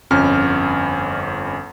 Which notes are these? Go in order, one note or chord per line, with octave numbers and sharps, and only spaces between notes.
G1 F2 C#4 F6